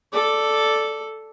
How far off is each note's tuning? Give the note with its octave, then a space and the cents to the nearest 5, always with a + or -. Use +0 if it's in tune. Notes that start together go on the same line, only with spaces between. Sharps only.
A4 +0 D5 +0